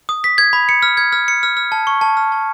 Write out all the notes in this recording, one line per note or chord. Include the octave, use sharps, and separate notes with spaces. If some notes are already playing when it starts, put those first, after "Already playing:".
D#6
B6
G#6
B5
C#7
F6
G#6
F6
C#7
F6
F6
A5
C#6
A5
F6
A5